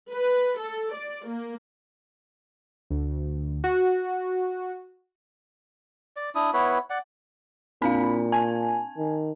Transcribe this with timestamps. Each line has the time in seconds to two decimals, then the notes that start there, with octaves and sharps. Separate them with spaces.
0.12 B4
0.58 A4
0.94 D5
1.27 A#3
2.90 D2
3.64 F#4
6.17 D5
6.35 D4 E4 D#6
6.53 B3 E4 B4 C#5
6.90 D5 F#5
7.82 A#2 C4 D4 F5 B5
8.32 G#5 A5
8.97 D#3